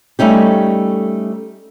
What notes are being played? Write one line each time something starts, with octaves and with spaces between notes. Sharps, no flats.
G3 A3 C#4 D#4 G4